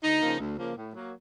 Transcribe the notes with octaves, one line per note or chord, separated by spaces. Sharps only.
D2 D#4
C#3 F3 A#3
D2
C#3 F3 A#3
A2
F#3 A#3